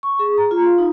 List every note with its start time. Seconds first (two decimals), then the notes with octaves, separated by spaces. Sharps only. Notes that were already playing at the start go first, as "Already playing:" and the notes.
0.03 C#6
0.19 G#4
0.38 A#5
0.51 F4
0.66 F5
0.78 D#4